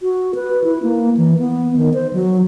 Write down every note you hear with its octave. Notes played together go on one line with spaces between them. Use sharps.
F#4
B4
E4
A#3
E3
B3
D#3
C5
F#3